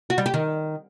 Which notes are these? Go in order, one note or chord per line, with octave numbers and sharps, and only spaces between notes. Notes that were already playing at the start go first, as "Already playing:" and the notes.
F#4
G3
G4
D#3